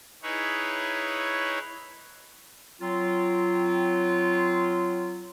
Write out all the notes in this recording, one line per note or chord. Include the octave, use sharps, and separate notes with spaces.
D#4 E4 G#4 B4 C#5
F#3 C4 F4